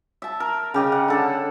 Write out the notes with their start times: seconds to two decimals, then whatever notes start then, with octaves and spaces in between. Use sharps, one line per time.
0.22 E5 A5
0.40 A#4
0.74 C#3 G4 D#5
0.92 F#5
1.08 D3 A4 F#5